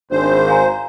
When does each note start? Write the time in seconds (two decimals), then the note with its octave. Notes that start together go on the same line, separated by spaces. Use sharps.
0.11 G#1 D4 C5
0.48 F5 G#5 A#5